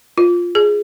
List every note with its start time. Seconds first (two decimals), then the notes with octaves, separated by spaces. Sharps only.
0.18 F4
0.55 G#4